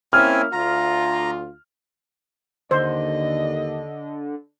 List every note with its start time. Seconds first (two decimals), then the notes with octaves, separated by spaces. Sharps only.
0.13 A#3 C4 C#4 E4 G#5 F6
0.53 D2 F4 A#5
2.71 D#2 D3 C5 D#5